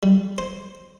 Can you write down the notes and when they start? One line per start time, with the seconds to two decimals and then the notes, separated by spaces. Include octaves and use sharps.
0.03 G3
0.38 C5